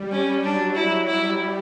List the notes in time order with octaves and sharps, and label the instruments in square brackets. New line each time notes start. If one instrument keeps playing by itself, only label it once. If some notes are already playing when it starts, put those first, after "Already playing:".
Already playing: [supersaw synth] G3
[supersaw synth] G3 [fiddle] C#4
[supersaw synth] F#3 [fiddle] D4
[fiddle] E4
[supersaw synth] G3 [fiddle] E4